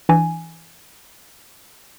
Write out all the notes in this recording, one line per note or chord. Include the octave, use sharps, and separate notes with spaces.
E3 D4 G#5